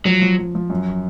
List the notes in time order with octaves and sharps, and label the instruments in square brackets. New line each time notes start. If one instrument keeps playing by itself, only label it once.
[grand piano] F3 [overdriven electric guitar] F#3
[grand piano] F3
F3
F3
F#2